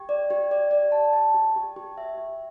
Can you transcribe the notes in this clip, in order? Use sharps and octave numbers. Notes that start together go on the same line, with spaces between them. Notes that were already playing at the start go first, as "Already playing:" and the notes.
Already playing: G4
D5
G4
D5
D5
A5
A5
G4
G4
G4
E5
G4